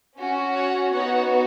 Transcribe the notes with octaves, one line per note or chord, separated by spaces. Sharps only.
C#4 F#4
C#5 F#5
B3 D#4 F#4 C#5 F#5